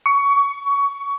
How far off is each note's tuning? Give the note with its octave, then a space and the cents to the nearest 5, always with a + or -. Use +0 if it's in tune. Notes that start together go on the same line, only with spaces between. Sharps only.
C#6 +20